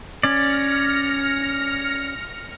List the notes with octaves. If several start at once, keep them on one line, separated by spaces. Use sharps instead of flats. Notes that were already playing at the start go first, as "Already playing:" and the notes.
C#4 D5 F6 A#6 C#7